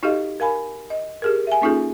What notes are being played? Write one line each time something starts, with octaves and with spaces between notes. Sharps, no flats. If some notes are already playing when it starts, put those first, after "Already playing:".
D#4 F#4 G4 A4 D#5 F5
A#4 F5 G#5 B5
D#5
G4 G#4 A#4
E5 G#5
A#3 C#4 D#4 F4 G#4 A4